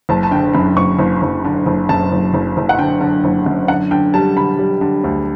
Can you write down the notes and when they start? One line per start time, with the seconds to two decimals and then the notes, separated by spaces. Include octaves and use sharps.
0.09 F#1 A5
0.23 A5
0.31 D3 G5
0.53 F#2 B5
0.76 F#1 C#6
0.99 F#1
1.22 F#1
1.45 D3
1.66 F#1
1.89 F#2 A5
2.12 F#1
2.34 F#1
2.57 F#1
2.69 F#5
2.78 D3 G5
3.01 D3
3.24 F#1
3.46 F#2
3.68 D3 F#5
3.91 D3 G5
4.14 G3 A5
4.36 D3 B5
4.59 G3
4.81 D3
5.04 D2